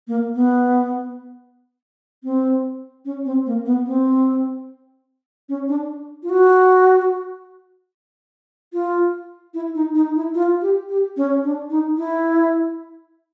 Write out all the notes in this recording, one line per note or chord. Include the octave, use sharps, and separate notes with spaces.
A#3
B3
C4
C#4
C4
A#3
B3
C4
C#4
D4
F4
F#4
F4
E4
D#4
D#4
E4
F4
G4
G4
C#4
D4
D#4
E4